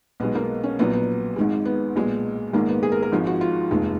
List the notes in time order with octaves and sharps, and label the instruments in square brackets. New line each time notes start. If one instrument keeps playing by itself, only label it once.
[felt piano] B1 B2 G#3 B3
A#3
C#4
A#1 A#2 F#3 B3
B3
G#1 G#2 D#3 G#3
B3
B1 A#2 G#3
A#1 G#2 D#3 G#3 A#3
B3
G#4
A#4
A#4
G#1 G#2 F3 G#3
F#4
F4
F1 D#2 D#3 G#3